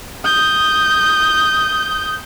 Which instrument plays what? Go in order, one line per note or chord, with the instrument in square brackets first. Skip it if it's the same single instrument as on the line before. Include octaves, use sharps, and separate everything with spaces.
[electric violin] D#6 G6